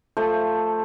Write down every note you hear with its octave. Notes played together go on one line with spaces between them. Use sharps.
F3 A3 C5